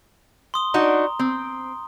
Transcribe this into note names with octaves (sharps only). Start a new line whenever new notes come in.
C6 D#6 G7
D4 D#4 F#4 A#5
C4